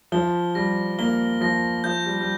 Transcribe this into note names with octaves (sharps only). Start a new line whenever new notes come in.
F3 G7
G3 A#6
A#3 G7
F3 A#6
F3 G6
G3
G3